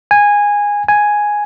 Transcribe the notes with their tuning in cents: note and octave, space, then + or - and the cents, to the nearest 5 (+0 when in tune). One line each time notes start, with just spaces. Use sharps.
G#5 -15
G#5 +0